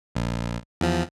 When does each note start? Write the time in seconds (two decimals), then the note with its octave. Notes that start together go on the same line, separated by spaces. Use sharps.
0.15 A#1
0.81 E2 F3